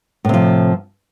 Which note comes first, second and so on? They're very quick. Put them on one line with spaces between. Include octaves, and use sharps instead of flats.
A2 C3 F3